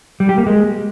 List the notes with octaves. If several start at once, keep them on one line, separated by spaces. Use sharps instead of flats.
G3
G4
A#3
G#3